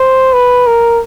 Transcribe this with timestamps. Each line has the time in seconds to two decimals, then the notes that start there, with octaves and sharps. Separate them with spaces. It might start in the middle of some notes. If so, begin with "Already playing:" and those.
Already playing: C5
0.33 B4
0.67 A#4